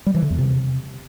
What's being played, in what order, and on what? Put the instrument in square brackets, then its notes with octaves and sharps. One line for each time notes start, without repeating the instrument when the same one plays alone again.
[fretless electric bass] G3
E3
D3
E2
C3